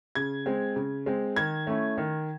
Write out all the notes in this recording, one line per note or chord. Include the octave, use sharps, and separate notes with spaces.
C#3 G#6
G#3 C4
C#3
G#3 C4
D#3 G#6
A3 C#4 E4
D#3